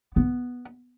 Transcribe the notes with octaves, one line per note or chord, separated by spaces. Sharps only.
B3